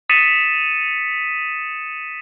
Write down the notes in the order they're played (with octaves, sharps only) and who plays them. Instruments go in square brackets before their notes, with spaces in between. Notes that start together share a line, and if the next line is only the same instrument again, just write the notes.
[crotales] D#6 A6 B6 C#7 D#7 E7